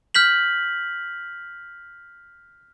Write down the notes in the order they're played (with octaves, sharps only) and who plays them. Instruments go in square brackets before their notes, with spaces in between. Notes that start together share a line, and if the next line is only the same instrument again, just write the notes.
[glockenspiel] F6 G6 B6 F#7